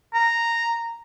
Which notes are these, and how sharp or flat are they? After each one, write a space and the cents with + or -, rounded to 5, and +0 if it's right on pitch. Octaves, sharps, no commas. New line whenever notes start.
A#5 -5